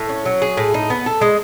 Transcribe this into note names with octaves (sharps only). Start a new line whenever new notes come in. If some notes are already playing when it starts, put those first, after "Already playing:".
Already playing: A2
C#4
F#3
G#4
A2
D#4
B3
A4
G#3